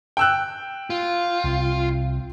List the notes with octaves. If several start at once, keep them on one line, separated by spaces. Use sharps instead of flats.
G5 E6 F#6
F4
C2